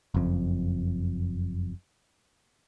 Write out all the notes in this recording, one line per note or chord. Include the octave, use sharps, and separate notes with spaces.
F#1 F2